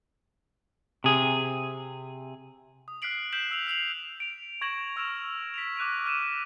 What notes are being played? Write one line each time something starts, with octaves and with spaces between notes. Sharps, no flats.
C3 G#4
D#6
F6 F#6 B6 C7 D7 F#7
F6 G6 B6 E7 F#7
E6 F7
F6 C7 F7 F#7
D7 F7
C#6 G#6 A#6 E7 F#7
C#6 E6 F6 D7 E7 F7
B6 D7 F7
D6 F#6 D#7 F7
F6 D#7 E7